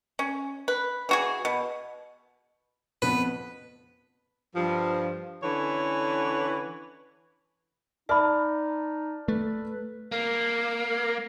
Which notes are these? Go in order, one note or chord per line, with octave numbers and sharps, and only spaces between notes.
C#4
B4
E3 F#4 G#4
B2
F2 B3 B4
G2 F3
D3 E3 C#4 B4 C#5
D#4 D5 E5 A5 B5 F6
A3 B4
A#3 F5